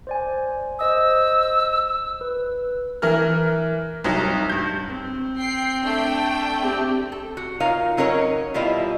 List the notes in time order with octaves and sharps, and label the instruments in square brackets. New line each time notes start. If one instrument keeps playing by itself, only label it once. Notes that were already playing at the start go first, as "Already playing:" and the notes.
[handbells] C5 D5 G#5
[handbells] C5 D#5 D#6 [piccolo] E6
[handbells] B4
[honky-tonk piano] E3 A#4 F6
C2 F#3 D#4
G2 G6
[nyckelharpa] C4
[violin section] G5 C7
A3 D4 G5
[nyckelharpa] C4 G4
[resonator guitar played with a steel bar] A4
F#4
D#4 F4 A#4 C#5 F5
F#3 C#4 D#4 A#4 C#5
B2 G3 E4 F4 D#5